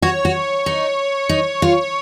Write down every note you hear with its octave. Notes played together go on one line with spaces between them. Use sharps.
F#4 C#5
F#4
D#4
D#4
F4